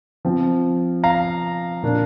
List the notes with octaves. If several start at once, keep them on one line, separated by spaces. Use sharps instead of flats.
F3 C4
F5 A#5
A#2 A#3 D4